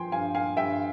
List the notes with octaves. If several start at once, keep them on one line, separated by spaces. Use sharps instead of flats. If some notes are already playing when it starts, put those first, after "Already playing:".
Already playing: F3 G5 G#5 C6
G2 F5 G#5
F5 G#5
G2 E5 G5